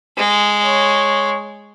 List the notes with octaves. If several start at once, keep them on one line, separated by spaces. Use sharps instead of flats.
G#3
C#5